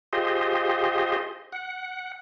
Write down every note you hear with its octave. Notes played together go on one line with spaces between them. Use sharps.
F4 G4 G#4 C5 D#5
F#5